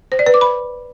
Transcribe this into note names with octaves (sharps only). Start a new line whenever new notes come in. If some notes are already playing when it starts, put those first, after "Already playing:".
C5
D5
B4
D6
B5